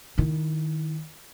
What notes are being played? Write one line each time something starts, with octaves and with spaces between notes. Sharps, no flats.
D#3 E4